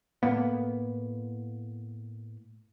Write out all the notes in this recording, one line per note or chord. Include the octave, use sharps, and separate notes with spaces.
A2 A#3 B3